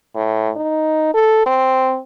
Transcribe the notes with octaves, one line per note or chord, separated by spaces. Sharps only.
A2
D#4
A4
C4